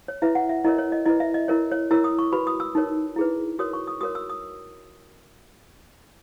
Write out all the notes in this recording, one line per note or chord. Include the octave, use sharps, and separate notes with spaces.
C#5
E4 B4 E5
F#5
E5
E4 A#4 C#5 D#5
C#5
D#5
E4 B4 D#5
E5
D#5
E4 A#4 C#5
C#5
E4 A#4 C#5 E6
D#6
C#6
F#4 B4 B5
D#6
E6
D#4 A#4 C#5
E4 G#4 B4
F#4 A#4 C#5 D#6
C#6
D#6
F#4 A#4 C#5 D#6
E6
D#6